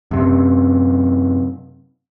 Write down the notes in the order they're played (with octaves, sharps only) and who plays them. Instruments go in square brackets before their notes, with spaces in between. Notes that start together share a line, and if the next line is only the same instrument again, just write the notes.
[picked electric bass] F#2 C3